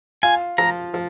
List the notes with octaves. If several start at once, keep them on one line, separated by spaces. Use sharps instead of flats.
F4 G#5
F3 A#5
F3